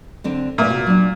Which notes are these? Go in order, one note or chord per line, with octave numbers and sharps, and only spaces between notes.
D3 C4 D4
A#2 A3 B4 E5
C3 F#4
F#3 D4